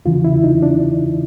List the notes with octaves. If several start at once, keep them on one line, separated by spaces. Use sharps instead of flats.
E2 C#3 E3 F4
E4
D#4
D4